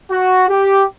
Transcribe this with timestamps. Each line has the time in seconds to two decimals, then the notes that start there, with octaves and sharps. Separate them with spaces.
0.11 F#4
0.49 G4